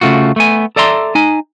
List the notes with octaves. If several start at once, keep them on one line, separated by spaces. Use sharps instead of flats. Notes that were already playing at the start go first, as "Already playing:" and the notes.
C#3 A3 F4 F#4
A3 B3 G#5
A4 D5 E5 A#5 C6
D#4 G#5